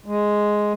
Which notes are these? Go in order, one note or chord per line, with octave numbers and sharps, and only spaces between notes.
G#3